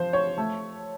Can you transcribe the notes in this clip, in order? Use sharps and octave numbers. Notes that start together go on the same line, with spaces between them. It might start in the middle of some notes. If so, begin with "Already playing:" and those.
Already playing: F3 C5
C#5
A3